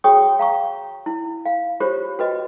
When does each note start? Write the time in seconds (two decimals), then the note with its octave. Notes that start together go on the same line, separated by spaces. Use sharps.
0.04 F#4 G#4 C#5 G5 C#6 D#6
0.39 F5 A#5 C#6
1.06 E4
1.46 F5
1.80 F4 G4 C5 C#5
2.19 F#4 B4 D#5